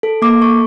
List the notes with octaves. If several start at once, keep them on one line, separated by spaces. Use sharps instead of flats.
A4
A#3 D6
A4 C#6